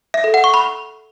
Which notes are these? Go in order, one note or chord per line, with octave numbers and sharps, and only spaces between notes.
E5
A4
F#5
C#6
B5